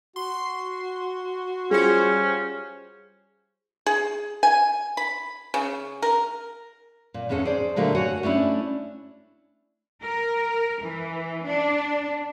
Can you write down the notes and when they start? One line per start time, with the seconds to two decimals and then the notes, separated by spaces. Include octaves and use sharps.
0.16 F#4 C6
1.71 G3 C#4 F4 G#4 C5 C#7
3.86 G#4
4.43 G#5
4.97 B5
5.54 C#3
6.02 A#4
7.14 A#2
7.29 E2 G#2 G#3 C#4 A4
7.45 G#4 C5 D5
7.76 A#2 D3 A3 A#3 G4
7.95 F#4 C#5 F#5 G#5
8.23 A3 C#4 D4 E4
10.03 A#4
10.82 E3
11.46 D4